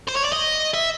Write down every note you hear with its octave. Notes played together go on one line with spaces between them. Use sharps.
C5
C#5
D5
D#5
E5